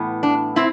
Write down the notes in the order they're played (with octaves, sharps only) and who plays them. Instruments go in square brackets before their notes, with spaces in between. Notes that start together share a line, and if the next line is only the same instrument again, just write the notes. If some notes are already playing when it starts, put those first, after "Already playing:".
Already playing: [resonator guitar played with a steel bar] A2 E3 B3
D4
C4 E4